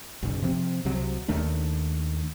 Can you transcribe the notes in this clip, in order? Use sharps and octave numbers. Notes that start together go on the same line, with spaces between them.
F#1 B1
C3 F3 C4
C2 C3 F#3
D#2 D#3 A3 D4